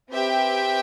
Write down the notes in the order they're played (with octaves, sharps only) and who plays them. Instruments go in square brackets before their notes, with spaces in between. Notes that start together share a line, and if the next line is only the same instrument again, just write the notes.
[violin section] C4 G4 B4 E5 G5